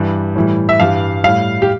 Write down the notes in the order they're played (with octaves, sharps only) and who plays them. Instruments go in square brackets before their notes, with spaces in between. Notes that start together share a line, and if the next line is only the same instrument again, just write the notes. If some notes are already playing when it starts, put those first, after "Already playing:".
Already playing: [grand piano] G2 E3 G3
A2 E3 G3
E5
G2 E3 G3 F5
A2 G3 F5
G4